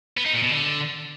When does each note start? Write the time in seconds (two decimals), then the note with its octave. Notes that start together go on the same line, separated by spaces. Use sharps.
0.17 B3
0.25 D#4
0.34 A#2
0.42 B2
0.51 D3